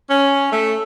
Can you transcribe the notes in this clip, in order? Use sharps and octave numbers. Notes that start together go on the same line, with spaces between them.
C#4
A3